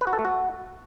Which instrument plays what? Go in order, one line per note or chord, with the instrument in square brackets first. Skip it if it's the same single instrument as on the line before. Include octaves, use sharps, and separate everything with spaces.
[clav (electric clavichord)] B4
F#4
A4
A3
F#4